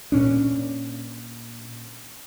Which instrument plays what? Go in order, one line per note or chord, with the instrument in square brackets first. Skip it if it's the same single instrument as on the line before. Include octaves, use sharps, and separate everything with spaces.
[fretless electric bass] A#2 C#4 D4